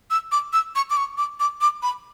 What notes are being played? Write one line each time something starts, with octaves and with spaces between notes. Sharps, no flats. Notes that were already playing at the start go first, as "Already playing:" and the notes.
E6
D6
E6
C#6
D6
C#6
D6
D6
D6
B5